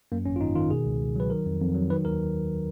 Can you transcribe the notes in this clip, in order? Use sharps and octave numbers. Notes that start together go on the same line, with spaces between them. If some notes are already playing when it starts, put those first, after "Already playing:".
F#2 A#3
G#1 C#4
F4
G#1 D#4
D#3 F4
B2 G#4
C#2
C#2
F#3 B4
D#3 A#4
F2
F2
F#3
D#3 B4
D#2 A#4